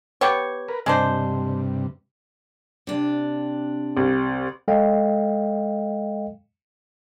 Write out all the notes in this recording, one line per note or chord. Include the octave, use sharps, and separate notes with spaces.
B3 G4 C#5
A#4 B4
G2 C3 G#3 D4 C5
C3 D4
C2
G#3 A4 D#5 F5 G5